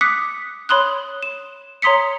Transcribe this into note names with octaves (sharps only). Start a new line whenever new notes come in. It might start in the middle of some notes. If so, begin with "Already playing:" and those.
D6 D#6 F#6 B6 C#7
C#5 B5 C6 D#6 F#6
E7
C#5 A#5 C6 D#6 B6 C#7